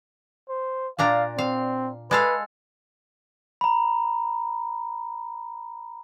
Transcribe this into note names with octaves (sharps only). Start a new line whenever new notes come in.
C5
A#2 D4 F5 A#5
C4 F5
G#3 A4 B4 F5
A#5 B5